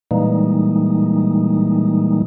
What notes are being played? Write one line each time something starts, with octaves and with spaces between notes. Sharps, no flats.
A#2 E3 G3 G#3 A#3 D#4